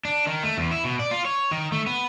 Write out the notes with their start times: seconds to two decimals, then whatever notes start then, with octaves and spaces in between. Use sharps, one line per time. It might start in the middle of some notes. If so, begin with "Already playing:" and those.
0.05 D4
0.27 D#3
0.43 A3
0.58 E2
0.71 E4
0.84 B2
0.99 D5
1.11 F4
1.25 C#5
1.51 D#3
1.72 A3
1.86 B3